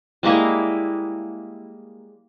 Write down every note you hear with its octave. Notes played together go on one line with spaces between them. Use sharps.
G3 G#3 A#3 E4